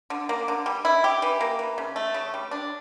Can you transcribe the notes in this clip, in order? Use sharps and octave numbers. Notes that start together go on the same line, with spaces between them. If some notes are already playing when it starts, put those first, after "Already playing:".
D3
A#3
D3
G3
E4
G4
E3
A#3
E3
C#3
A3
C#3
G3
D4